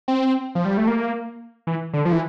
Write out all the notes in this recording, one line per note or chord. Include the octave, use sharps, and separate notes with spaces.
C4
F3
G3
A3
A#3
E3
D3
F3
E3